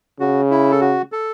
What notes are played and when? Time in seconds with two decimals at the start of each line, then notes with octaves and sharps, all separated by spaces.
0.20 C#3 F#4
0.51 E4
0.71 A4
0.81 F#4
1.12 A4